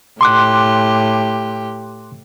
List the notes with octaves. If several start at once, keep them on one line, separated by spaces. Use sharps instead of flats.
A2 G4 C6 D6 F#6